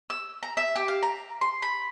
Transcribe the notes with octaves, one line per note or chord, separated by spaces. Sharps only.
E6
A#5
E5
G4
F5
A#5
C6
B5